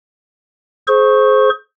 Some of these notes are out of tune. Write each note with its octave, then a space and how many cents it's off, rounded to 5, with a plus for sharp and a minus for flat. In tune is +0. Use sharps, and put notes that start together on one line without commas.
G#4 +35 C5 +0 C#6 -15